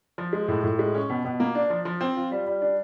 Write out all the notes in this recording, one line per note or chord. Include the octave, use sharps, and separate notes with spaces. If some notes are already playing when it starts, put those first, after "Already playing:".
F3
G#3
A2
A2
G#3
C#4
B2
B2
A#3
D4
F3
F3
C4
F4
G3
G3
D4